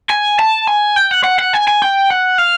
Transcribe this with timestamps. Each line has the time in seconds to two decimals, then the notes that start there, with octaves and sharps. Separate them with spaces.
0.10 G#5
0.39 A5
0.67 G#5
0.96 G5
1.11 F#5
1.24 F#5
1.39 F#5
1.54 G#5
1.68 G#5
1.82 G5
2.10 F#5
2.38 F5